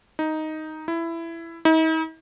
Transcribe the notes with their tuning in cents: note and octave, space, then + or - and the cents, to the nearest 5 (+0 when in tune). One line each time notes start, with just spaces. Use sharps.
D#4 +5
E4 +15
D#4 +45